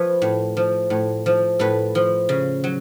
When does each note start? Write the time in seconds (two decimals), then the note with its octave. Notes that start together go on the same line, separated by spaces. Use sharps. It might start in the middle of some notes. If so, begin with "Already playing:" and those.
Already playing: F3 B4 C#5
0.22 A2
0.57 F3
0.90 A2
1.26 F3
1.59 A2 A4 B4
1.95 F3
2.29 C#3
2.64 F#3